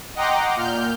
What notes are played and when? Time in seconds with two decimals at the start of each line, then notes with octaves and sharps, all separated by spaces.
0.15 D#5 F#5 G5 A#5 C6 D6
0.56 A#2 F6 G6